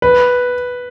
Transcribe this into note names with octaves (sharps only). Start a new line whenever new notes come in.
B4